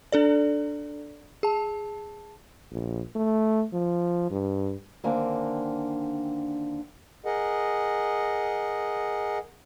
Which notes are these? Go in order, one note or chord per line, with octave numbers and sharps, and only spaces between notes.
D4 A4 D5
G#4 A5
A#1
A3
F3
G2
D3 D#3 A#3 C4 D4 G#5
G#4 A#4 D#5 F#5